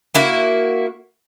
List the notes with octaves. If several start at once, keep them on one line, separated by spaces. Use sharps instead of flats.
A#3 E4 F#4